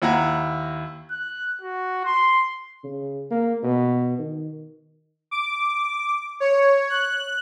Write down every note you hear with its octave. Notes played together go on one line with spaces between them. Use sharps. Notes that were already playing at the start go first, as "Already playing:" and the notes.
D#2 E4 F#5 A#5
F#6
F#4
C6
C#3
A#3
B2
D#3
D6
C#5
F#6